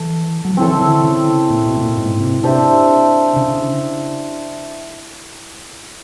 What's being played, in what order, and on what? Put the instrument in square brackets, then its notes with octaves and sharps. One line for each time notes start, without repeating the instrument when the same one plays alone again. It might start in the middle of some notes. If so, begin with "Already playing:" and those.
Already playing: [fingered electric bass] E3 [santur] A4
[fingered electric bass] F#3
F3
[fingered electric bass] E3 [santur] C4 E4 A4 C#5
[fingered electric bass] D#3
D3
C#3
A#2
B2
A2
A#2
G#2
C3
[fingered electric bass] C3 [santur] D4 G4 C5 E5
[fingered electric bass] C#3